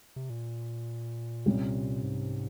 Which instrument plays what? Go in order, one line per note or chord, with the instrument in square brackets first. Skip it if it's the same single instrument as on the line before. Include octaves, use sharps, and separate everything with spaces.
[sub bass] C3
A#2
[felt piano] C2 C3 G3 C#4
[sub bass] G#2